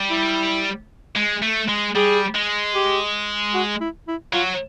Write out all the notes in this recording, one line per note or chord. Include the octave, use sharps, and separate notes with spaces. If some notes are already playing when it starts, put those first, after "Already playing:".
Already playing: G3
E4
G#3
A3
G#3
G3 G#4
G#3
G4
F#4
E4
E4
F#3 F4